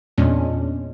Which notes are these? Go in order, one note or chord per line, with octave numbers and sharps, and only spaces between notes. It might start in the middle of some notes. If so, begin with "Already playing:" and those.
E2 A#2 G#3 C#4 D4